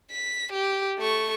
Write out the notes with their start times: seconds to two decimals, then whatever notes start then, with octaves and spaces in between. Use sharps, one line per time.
0.11 B6
0.52 G4
0.98 A3 C#6